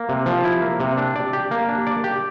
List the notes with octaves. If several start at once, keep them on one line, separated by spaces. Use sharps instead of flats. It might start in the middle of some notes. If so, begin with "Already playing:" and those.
Already playing: A#3
C3
F3
E4
A#3
C3
D4
D5
G4
A#3
D4
D5
G4